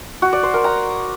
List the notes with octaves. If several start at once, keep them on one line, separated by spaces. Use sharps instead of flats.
F#4
D5
C5
A#4
A#5